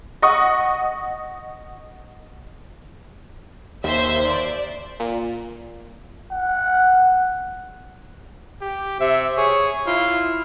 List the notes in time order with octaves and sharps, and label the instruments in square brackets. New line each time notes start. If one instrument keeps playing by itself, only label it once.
[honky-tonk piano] D#5 F#5 C#6 D#6
[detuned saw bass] D#2 [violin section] C5 E5
[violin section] D5
[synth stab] A#2
[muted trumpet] F#5
[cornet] G4
[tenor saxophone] C3 [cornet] E5
[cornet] G#4 [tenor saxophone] C#5
[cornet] E4 [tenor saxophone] F4